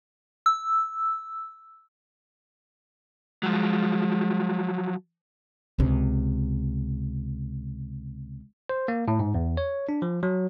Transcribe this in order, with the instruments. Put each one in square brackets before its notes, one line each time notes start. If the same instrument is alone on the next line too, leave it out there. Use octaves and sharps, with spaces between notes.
[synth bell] E6
[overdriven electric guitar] F3 F#3 [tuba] G#3
[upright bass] C#2 C3
[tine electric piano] C5
A#3
A2
G#2
E2
C#5
D4
F3
F#3